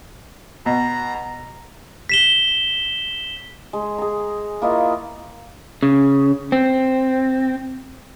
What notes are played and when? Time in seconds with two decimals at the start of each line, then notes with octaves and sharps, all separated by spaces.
0.66 B2 A#5
2.09 B6 E7 G7
3.73 G#3
3.98 G#4 A#5
4.62 A#3 E4 F4 D#5
5.83 C#3
6.52 C4